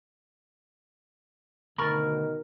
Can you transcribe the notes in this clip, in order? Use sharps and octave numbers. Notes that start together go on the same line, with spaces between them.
D2 B2 D#3 A#4 B5 C#6 A6